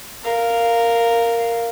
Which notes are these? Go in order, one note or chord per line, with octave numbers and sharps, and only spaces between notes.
A#4 F5